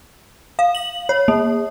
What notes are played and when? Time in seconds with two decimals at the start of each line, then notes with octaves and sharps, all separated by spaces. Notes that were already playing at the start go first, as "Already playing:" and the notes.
0.59 F5
0.75 F#7
1.09 C#5
1.28 A#3